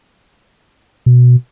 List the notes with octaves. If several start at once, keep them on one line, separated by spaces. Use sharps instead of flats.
B2